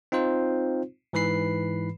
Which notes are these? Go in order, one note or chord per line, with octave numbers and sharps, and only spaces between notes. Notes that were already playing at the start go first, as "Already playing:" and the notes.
C4 D#4 F4 C5
G#2 E3 B4 B5 C7